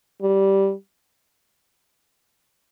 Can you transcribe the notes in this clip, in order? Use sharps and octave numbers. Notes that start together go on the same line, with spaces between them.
G3